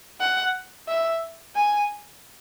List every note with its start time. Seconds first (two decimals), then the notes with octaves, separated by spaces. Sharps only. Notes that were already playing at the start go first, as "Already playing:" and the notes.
0.20 F#5
0.88 E5
1.55 G#5